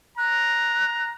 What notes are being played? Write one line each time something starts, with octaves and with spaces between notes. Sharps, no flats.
A#5 F#6